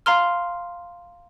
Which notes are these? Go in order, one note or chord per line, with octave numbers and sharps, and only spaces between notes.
F5 A#5 C6 F6